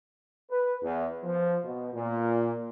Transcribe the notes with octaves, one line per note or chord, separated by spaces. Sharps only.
B4
E2
F3
B2
A#2